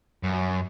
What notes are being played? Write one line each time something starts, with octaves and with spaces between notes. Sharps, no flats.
F#2